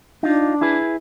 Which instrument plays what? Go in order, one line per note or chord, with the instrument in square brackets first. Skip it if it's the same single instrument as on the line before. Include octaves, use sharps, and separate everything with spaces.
[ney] D4 [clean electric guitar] D#4 F4
[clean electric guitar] E4 G#4 B4